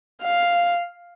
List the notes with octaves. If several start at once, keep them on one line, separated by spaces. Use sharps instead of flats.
F5